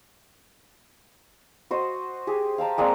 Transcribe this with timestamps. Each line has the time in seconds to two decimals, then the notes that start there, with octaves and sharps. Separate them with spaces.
1.71 F#4 C5 D#5
2.27 G4 G#4
2.58 F5 G5 A5 A#5
2.78 G#3 A#3 C4 D5